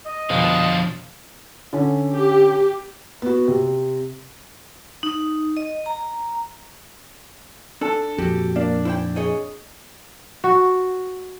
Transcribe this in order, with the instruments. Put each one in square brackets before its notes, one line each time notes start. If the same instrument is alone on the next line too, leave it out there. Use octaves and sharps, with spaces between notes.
[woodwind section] D#5
[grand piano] G1 F2 B2 [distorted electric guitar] F3 D4 [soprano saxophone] F5
[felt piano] D3 C#4
[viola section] G4
[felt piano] B3 F#4
C3
[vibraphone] D#4
D#5
A#5
[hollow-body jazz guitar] D4 [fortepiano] A4
[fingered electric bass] F2 A#2 [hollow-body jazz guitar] F#4 G4
[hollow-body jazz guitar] A#3 [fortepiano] D4
[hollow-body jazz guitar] E4 C5 G5
G#4 C#5 D#5
[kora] F#4